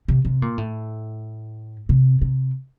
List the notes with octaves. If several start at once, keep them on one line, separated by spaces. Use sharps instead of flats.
C3
C3
A#2
A2
C3
C3